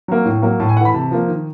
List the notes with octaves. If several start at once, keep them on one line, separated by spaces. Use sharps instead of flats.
F#3 A#3
A2
F#3 A#3
A2 A5
G#5
E3 A3 F#5 B5
C3 A5
F3 A#3
D#3